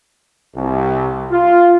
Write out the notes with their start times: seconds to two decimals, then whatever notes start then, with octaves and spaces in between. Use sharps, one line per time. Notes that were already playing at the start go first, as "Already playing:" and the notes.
0.56 C2
1.31 F4